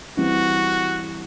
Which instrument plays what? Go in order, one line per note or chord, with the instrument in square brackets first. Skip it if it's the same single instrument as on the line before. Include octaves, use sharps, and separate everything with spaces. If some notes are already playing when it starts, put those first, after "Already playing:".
[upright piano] E3 G3 C4 [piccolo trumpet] F#4